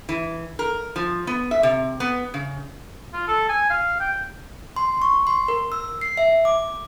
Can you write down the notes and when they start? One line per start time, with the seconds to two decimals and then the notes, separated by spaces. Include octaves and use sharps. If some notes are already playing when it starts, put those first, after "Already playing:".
0.09 E3
0.59 A#4
0.96 F3
1.27 B3
1.51 E5
1.63 C3
2.00 B3
2.34 C#3
3.14 F4
3.28 A4
3.49 G#5
3.70 F5
4.00 G5
4.76 C6
5.02 C#6
5.27 C6
5.48 A#4
5.72 E6
6.01 C7
6.17 E5
6.45 D6